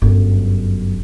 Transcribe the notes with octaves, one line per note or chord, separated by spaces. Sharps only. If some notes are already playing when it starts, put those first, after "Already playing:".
G1 F#2